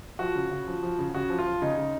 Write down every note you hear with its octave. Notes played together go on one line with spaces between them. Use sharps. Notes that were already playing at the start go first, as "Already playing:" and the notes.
F3 F#4
C#3
C#3
F3
F3
C#3
C#3 F#4
F3
F4
F3
C#3 D#4
C#3